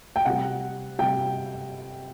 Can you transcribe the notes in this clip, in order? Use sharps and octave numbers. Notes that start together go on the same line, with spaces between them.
G5
C3 G3 F#5
C3 G3 G5